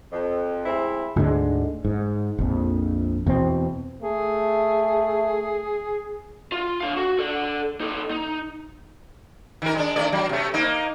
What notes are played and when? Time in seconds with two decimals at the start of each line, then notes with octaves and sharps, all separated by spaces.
0.12 F2
0.66 G#3 A3 C4 E4
1.16 D2 G#2 D3 G#3
1.85 G#2
2.39 A#1 F2
3.26 E2 B2 C4
4.02 A3 G#4
6.52 F4
6.81 D3 F5
6.97 F#4
7.19 A4 D5
7.80 D#4 A4
8.11 D#4
9.62 D#3 A#4
9.76 G#3 D4
9.96 D#3 A3 D5
10.12 F#3
10.29 C3 A3
10.54 A#3 D#4